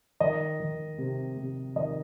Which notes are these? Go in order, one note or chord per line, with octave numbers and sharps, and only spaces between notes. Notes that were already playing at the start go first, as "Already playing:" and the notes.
D#3 D#5
D#3
C3
C3
D#3 D#5